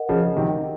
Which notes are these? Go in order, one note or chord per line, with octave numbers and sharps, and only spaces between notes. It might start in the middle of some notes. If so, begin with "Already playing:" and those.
Already playing: A#4 D#5 F#5
C#3 F3
C3 D#3